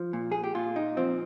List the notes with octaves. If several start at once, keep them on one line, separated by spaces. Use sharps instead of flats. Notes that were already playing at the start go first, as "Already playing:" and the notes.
Already playing: F3
A#2
G#4
G4
A#2 F4
D#4
F3 C4